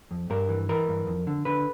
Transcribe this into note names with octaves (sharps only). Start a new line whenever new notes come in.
F2
G2 A#4
E3
E3 A#4
G2
F2
D3
D3 B4